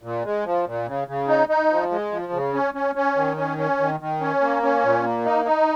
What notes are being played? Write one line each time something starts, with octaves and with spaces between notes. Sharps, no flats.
A#2
G#3
F3
A#2
C#3
C#3
D#4
D#4
F3
G#3
F3
C#3
C#4
C#4
C#4
D#3
C#4
C#4
D#3
D#3
C#4
A#3
C#4
A#2
A#3
D#4
D#4